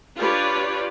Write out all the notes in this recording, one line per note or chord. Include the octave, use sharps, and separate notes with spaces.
D4 F4 G4 B4 C#5 D5